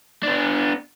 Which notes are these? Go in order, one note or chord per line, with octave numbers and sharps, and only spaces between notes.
B3 D4